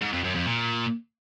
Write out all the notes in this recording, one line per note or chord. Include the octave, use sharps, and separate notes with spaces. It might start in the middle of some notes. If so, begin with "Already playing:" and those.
G#2
F2
F#2
F2
A#2